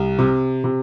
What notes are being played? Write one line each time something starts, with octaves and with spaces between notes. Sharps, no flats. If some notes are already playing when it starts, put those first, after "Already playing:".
Already playing: C2
C3
C3